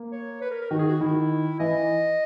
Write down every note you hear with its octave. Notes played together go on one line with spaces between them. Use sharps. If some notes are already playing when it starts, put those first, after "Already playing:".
Already playing: A#3
C#5
B4
A#4
A#4
D#3 F#4
G#4
F#4
D#3 E4
E3 D#5